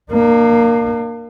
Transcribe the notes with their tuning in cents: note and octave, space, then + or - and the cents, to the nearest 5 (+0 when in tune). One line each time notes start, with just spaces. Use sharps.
A#3 +0 D4 +40